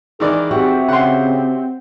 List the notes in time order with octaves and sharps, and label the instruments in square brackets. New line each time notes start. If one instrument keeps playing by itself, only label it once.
[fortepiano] D#3 E3 D5 [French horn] G#4
[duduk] C4 [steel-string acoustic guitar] F#4 G4 E5
[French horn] C#3 [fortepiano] F#5 C6